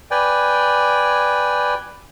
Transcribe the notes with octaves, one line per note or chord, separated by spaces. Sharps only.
B4 D5 G5 G#5